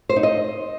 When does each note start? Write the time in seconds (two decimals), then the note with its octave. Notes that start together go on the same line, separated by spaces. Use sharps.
0.09 C5
0.16 D#4
0.23 D#5